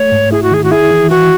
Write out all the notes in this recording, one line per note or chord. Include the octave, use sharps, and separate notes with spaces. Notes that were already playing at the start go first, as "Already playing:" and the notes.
Already playing: A3 C#5
G#2
E4 G#4
F#4
D#3 G#4
F#4
E4 G#4
E3
E3 F#4